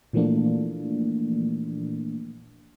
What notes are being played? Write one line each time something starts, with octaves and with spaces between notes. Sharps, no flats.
A#2 E3 F3 A3 A#3 D4